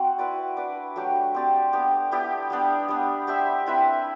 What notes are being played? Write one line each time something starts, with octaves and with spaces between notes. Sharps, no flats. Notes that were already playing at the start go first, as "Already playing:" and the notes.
Already playing: C4 F#4
E4 B4 D5
D4 F#4 B4 D5
F#3 A3 D4 G4
C4 G4 D5
B3 D4 G4
B3 E4 G4 D5
G3 B3 D4
G3 B3 D4
D4 G4 C5 E5
C4 E4 B4 E5